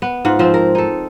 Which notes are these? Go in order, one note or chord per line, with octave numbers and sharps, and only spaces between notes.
B3
G#2 F4 F#5
F3 C4
A#4
D#4 A4